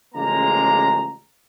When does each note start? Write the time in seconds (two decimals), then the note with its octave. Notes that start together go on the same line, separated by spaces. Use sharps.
0.15 A1 C#3 F3 G#3 A#3 A#5